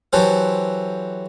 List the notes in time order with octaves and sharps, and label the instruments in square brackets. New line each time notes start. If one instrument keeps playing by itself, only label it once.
[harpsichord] E3 F#3 G4 A4 C5